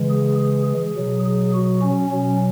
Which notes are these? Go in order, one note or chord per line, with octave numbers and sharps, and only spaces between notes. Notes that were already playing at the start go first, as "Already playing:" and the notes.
Already playing: C#3 E3 G#3
G#4
G#4
G#4
B2 F#3
G#4
F#4
C#4
B2 F#3 C#4